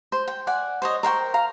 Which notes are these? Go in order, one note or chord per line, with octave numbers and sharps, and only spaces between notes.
C5
G5
D5 F#5 G#5
C5 C#5 D#5
A#4 C5 G5 C#6
F5 A#5